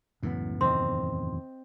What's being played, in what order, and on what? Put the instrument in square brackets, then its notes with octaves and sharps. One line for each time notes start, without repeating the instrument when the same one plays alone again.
[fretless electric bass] C#2 E3 B3 [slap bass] F#2 A2
[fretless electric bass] E2 C3 D#3 [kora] C4 D#5 [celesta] C6